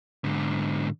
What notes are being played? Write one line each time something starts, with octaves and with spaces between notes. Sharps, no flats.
G#2 D3